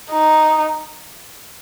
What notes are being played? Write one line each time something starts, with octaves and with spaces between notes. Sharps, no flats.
D#4